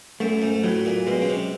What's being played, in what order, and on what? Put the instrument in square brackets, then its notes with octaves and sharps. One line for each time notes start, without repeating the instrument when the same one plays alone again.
[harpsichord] F#2 [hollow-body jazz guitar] A3
[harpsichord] G#2
[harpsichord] A2 [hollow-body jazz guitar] F#3
[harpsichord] A#2
[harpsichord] B2 [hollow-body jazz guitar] G#3
[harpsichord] C#3
C3